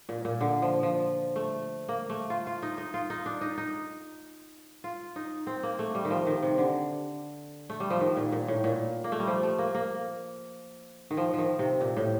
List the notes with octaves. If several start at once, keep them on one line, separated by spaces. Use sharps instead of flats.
A#2
A#2
D3
F3
F3
A3
A#3
A3
F4
F4
D#4
D#4
F4
D#4
D4
D#4
D#4
F4
D#4
C4
A#3
A3
G3
D#3
F3
D#3
C3
D3
A3
G3
F3
D#3
A#2
A#2
A2
A#2
A#3
A3
G3
F3
A3
A#3
A#3
D#3
F3
D#3 F3
C3
A#2
A2